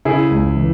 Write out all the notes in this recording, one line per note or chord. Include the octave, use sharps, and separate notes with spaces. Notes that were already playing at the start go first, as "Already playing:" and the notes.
C#3 E4 G#4
C#2
E3